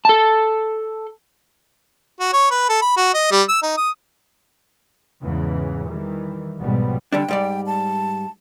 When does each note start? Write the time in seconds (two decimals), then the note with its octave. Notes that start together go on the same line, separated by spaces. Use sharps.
0.05 A4 A5
2.20 F#4
2.33 C#5
2.51 B4
2.69 A4
2.82 B5
2.97 F#4
3.14 D#5
3.32 G3
3.49 E6
3.63 D#4
3.77 D#6
5.23 E2 G#2 C#3 E3
5.88 D#3 E3 G3
6.60 B1 G#2 B2 F3 G3 B3
7.12 D3 G3 D4 G5
7.28 G#2 G3 D5
7.67 A5